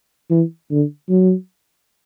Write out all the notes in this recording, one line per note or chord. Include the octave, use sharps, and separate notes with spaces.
E3
D3
F#3